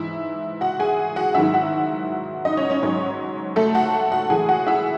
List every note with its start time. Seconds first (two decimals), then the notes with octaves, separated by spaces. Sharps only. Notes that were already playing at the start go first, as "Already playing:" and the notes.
Already playing: G#2 E3 E4 E5
0.61 F#4 F#5
0.79 G#4 G#5
1.16 F#4 F#5
1.34 G#2 D#3 F#3 E4 E5
1.54 F#4 F#5
2.45 D#4 D#5
2.57 C#4 C#5
2.70 C#4 C#5
2.83 G#2 F#3 C#4 C#5
3.56 A3 A4
3.75 F#4 F#5
4.12 F#4 F#5
4.30 A2 E3 G#4 G#5
4.49 F#4 F#5
4.67 E4 E5